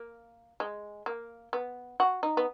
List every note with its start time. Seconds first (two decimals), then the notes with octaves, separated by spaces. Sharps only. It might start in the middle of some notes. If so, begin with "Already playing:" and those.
Already playing: A#3
0.60 G#3
1.06 A#3
1.53 B3
2.00 F#4
2.23 D#4
2.37 B3